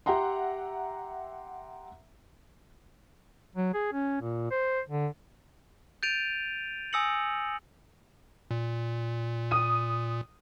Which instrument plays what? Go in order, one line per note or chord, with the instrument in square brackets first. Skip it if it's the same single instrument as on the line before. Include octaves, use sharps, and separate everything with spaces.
[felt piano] G4 E5 F#5 A#5 C6
[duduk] F#3
G#4
C#4
A#2
C5
D3
[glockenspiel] G6 A6 D7 D#7 F7
G#5 D#6 E6 A#6 C#7 F#7
[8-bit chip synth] A#2
[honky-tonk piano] D#6 D#7